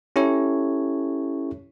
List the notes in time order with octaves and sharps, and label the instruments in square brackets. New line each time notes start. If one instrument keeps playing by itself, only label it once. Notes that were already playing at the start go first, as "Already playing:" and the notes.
[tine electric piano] C#4 E4 G4 A4 C#5